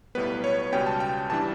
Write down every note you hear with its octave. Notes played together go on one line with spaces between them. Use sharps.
B1 A2 G3 B3 B4
C#5
C#2 B2 G3 C#4 G5
A5
G5
G1 E3 G3 D4 A5